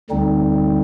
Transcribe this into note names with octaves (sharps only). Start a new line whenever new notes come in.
D2 D3 G3 C4 D#4